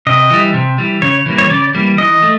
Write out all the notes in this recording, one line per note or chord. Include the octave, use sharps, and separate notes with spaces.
C3 D#5
E3 G3
C3
E3 G3
C#3 C#5
E3 G3 A#3
C#5
C#3 D5
E3 G3 A#3
E3 D#5
A3